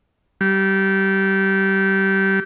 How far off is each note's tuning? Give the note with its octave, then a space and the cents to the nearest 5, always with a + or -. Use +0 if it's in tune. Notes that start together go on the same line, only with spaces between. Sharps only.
G3 -20